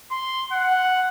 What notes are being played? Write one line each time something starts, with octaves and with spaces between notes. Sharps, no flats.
C6
F#5